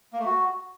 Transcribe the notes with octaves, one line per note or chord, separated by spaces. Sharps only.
A#3
A3
F#4